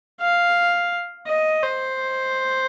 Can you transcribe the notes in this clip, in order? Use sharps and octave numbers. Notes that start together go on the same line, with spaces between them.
F5
D#5
C5